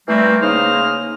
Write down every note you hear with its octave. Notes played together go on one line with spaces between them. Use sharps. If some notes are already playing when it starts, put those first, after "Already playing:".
E3 G3 A3 A#3 C4
C#3 A#3 D#4 C5 D#6 F6